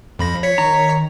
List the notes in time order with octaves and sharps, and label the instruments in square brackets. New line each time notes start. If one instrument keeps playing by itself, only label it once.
[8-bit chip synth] F2 B5 A#6 [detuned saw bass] F3
[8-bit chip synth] C#5 B6 C#7
[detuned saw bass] D#3 [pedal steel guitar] A#5